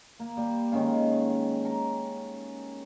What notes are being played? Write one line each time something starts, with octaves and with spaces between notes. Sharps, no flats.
A#3
G3 A#3
D#3 G#3 C#4 F5
A#4